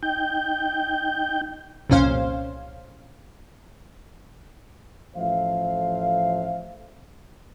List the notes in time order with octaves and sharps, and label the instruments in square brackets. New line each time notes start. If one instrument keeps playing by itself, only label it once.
[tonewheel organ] D#4 G5 G6
[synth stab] C2 F2 A#2 C#4 C5 F5
[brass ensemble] A1 F3 A4 C5 E5 F5